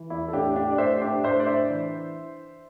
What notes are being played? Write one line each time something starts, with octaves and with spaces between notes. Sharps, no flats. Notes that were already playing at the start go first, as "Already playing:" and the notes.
Already playing: E3
E2 E4
A4
A2 D4 G4
D4 G4
D5
A2 C5 E5
D4 G4
A2 C5 E5
D5
D4 C5 E5
E3